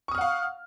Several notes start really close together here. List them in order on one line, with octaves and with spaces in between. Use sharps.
C#6 D#6 F6 F#5 F5